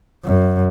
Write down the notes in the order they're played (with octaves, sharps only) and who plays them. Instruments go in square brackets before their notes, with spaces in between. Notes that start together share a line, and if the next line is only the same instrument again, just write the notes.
[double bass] F#2